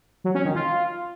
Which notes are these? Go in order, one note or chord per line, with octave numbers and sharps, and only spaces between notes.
F#3
C#4
D#3
F4